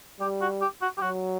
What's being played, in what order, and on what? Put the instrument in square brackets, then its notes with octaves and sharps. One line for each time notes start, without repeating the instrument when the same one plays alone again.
[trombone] G3 [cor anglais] G4
[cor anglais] F#4
G4
F#4
G4
[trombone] F#3 [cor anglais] F#4